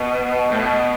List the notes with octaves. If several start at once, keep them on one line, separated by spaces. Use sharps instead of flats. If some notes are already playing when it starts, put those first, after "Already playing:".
Already playing: B2
A2
B2